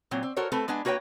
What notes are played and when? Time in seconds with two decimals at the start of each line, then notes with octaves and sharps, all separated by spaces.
0.11 A#2 F#3 C4
0.23 C4
0.37 F#4 A4 A#4 C5 C#5
0.52 A3 C4 A4 B4
0.68 G#3 B3 D4 G#5
0.85 A#3 F#4 B4 C#5 G5